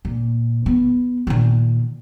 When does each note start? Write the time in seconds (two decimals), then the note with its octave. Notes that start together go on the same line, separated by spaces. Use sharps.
0.05 A#2
0.66 B3
1.27 A#2 D#3